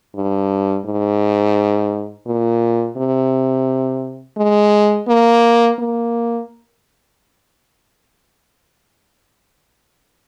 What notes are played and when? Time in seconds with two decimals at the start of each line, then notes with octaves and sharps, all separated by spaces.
0.15 G2
0.86 G#2
2.27 A#2
2.97 C3
4.38 G#3
5.08 A#3
5.79 A#3